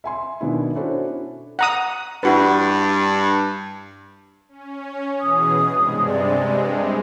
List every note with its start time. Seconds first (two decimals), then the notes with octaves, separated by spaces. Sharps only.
0.04 E5 G#5 C6
0.41 B2 D#3 B3 D4 E4
0.75 C#4 D4 E4 F#4 A4 C5
1.59 F#5 A#5 D#6
2.23 G2 E4 F#4 B4
4.49 C#4
5.21 B2 E3 G#4 D#6
5.73 G2 C3 G#3
6.06 D5